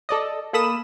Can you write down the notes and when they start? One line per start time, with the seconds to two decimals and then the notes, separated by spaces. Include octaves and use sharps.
0.09 A4 D5 D#5
0.53 A#3 A4 B5 D#6 E7